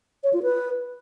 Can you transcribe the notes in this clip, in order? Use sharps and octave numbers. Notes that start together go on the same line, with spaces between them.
C#5
F4
B4